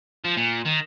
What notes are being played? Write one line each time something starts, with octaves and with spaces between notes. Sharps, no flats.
F3
A#2
D#3